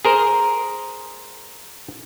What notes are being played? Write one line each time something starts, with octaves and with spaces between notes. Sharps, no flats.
G#4 A#4 C5